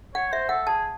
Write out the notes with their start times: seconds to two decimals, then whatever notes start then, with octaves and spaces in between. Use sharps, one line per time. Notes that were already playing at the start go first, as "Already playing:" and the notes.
0.15 C#5 F#5
0.32 C5 E5
0.49 A4 F#5
0.67 G#4 A5